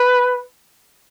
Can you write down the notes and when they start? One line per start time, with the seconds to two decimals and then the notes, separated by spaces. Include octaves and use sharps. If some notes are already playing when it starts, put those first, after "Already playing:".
Already playing: B4